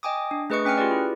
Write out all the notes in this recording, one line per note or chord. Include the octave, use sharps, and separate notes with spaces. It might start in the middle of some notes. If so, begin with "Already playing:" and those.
D#5 G5 G#5 D6 D#6
D4
A3 G#4 B4 D#5 C#6 C#7
C#4 G5 G#5 F6 C#7
F4 G4 G#4 B4 D5
E4